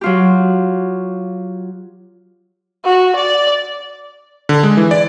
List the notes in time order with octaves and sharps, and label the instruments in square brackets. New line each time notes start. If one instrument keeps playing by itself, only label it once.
[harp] F#3 F4 G4
[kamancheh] F#4
D5
[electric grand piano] D3
G#3
E3
D5